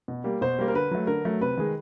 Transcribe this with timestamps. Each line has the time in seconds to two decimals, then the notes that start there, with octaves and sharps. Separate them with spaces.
0.08 B2
0.24 G3 A#3
0.41 B2 C5
0.59 G3 A#3
0.68 A#4
0.74 D3 B4
0.91 F#3 A3
1.07 D3 A#4
1.25 F#3 A3
1.41 C3 B4
1.57 D#3 G#3